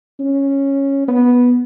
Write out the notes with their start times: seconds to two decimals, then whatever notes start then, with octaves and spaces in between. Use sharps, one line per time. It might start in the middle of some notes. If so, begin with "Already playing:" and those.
0.20 C#4
1.08 B3